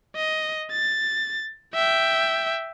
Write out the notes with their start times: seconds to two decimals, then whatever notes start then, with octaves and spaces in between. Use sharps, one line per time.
0.16 D#5
0.71 A6
1.74 E5 G5